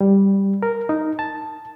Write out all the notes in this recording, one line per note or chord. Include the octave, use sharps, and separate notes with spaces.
G3
A#4
D#4
A5